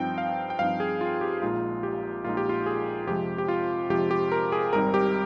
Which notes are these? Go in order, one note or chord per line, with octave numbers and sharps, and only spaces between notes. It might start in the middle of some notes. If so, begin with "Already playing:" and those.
Already playing: G2 F3 C4 D#4 G5
F5
G5
G2 F3 C4 D#4 F5
G#4
F4
G4
A#1 A#2 G#3 D#4 F4
G4
A#1 A#2 G#3 D#4 F4
G4
F4
G#4
F2 C3 F3 G#3 G4
G4
F4
F2 C3 F3 G#3 G4
G4
A#4
G#4
G#1 G#2 G3 C4 D#4 A#4
G4